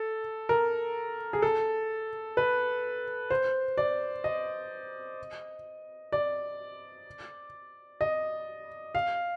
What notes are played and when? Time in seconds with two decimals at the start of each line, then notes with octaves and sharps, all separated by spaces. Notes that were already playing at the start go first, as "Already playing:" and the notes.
Already playing: A4
0.49 A#4
1.33 G#4
1.42 A4
2.37 B4
3.30 C5
3.78 D5
4.24 D#5
6.12 D5
8.01 D#5
8.95 F5